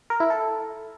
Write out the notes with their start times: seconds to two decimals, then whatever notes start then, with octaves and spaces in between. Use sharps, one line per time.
0.10 A#4
0.20 E4
0.30 A4